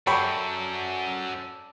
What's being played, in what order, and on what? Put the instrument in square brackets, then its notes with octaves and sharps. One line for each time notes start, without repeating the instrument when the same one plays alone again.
[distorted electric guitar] F#2 [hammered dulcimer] A4 D5 [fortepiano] C#5 G5 B5